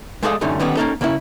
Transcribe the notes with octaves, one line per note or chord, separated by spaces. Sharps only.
G#3 A3 A4 D5 D#5 F5
C2 F#2 D3 A3 C#4 D#4
D3 D#3 G3 B3 C#4
A#3 C4 C#4 D#4 A4
C#3 A#3 C#4 E4